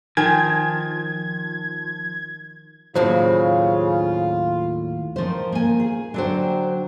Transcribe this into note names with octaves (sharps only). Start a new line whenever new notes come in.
D#3 F3 G#5 G#6
D#2 A2 C#3 F#3 F4 C5
D#3 F3 C#4 C5
A#3 G#5
G#4
D3 F#3 D4 C5 G5